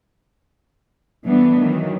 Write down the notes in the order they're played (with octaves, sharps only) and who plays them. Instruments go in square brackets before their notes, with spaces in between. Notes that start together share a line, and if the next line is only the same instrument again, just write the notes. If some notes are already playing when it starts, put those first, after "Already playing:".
[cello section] E3 G3 A3 B3 D4
D#3 E3 F#3